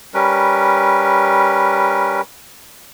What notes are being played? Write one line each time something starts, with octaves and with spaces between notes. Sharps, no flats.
G3 C#4 A#4 B4